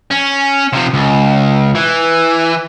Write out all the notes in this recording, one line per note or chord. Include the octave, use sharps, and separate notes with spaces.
C#4
C3 F3
C#2
E3